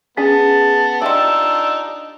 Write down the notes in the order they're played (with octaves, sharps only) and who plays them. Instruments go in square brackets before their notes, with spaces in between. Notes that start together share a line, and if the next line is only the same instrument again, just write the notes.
[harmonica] B3 [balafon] C#4 [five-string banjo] G#4 [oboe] A5
[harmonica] D4 D#4 F4 [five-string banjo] G4 [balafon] E5 C6 [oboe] E6